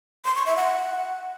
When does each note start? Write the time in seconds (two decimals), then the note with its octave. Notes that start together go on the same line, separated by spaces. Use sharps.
0.25 C6
0.35 C#6
0.46 E5
0.57 F#5